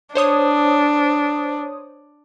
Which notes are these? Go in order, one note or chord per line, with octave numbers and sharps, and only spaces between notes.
D4 C5 C#5 D#6